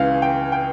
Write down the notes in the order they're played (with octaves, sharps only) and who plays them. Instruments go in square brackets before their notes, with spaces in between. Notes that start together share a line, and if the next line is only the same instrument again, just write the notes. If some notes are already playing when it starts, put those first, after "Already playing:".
Already playing: [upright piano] C#2 C#3 E3 F5
G5
G5